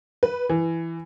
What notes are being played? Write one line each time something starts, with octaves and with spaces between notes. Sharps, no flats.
B4
E3